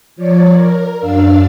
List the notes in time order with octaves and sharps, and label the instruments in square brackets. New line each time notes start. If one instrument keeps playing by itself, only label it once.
[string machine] F3 C#5 D5
A#4
F#2 D4 F5 E6